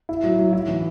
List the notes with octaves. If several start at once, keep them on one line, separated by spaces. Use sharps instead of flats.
E4
F#3
F#3
E4
E3